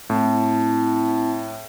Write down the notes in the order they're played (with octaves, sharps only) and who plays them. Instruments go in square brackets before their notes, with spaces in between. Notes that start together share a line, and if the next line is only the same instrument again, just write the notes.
[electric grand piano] A2 [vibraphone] C4 E4 A5